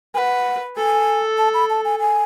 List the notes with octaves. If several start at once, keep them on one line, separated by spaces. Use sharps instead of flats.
B4 F#5 G#5
A4 G#5
A5
B5
A5
G#5
G#5